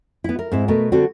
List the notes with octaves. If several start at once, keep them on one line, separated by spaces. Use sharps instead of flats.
B3 E4
A#4
G#2 C4 E4
B2 A3 B3 A#4
D3 G3 C4 F#4